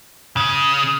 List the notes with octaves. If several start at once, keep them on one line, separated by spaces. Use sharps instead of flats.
C#3